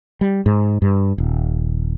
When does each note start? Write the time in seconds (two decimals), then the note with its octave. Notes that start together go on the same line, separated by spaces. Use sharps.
0.21 G3
0.46 G#2
0.82 G2
1.18 D#1